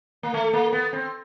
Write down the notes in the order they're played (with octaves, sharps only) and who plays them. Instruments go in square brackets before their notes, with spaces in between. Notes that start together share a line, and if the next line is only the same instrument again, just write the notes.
[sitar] A#3
A3
A#3
B3
C4